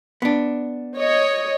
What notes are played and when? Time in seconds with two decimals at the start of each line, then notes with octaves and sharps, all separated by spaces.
0.22 B3 D4
0.97 C#5 D#5